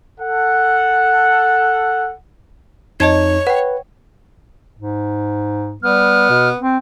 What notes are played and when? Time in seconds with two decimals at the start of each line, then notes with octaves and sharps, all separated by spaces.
0.19 A4 F#5
3.00 F2 D#4 C#5 D#5 A5 G#6
3.47 B4 F#5 G5
4.78 G#2
5.83 G3 B3 F6
6.29 B2
6.60 C4